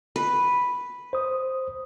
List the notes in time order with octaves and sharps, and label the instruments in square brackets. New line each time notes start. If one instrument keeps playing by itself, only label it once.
[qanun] B4
[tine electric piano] C5 D#6